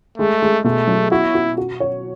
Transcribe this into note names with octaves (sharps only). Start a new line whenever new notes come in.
G#3 A3
G#3
B2 A3
F#3
E4 F#4
F#4
F#4
C#5